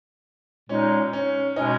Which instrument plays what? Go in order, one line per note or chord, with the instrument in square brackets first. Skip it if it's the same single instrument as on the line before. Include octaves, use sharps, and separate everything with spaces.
[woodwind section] A#2 G#3 D#4 [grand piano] C#4
[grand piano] C#4
[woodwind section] B2 G#3 C#4 [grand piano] D#4